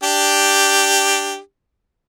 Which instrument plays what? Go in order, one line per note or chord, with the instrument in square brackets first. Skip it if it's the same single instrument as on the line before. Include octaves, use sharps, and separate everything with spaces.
[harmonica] D4 G4